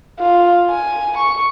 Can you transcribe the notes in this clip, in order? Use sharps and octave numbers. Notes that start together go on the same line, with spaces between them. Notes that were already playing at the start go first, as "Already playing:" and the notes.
F4
G#5
C#6